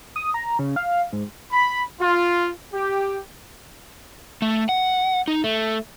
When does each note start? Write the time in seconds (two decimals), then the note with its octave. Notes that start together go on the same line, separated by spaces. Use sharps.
0.16 D#6
0.34 A#5
0.59 C#3
0.76 F5
1.13 G#2
1.52 B5
2.00 F4
2.72 G4
4.42 A3
4.69 F#5
5.28 D#4
5.44 A3